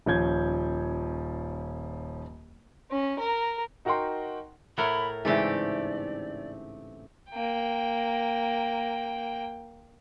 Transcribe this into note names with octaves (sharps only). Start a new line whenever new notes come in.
D#1 F3 C#4 G6 G#6
C#4
A#4
D#4 F#4 A#4 F#5 G5 C6
A2 A#4 C#5 E5 F#5 B5
G#2 C#3 E3 A3 C4 G4 D5
A#3 G5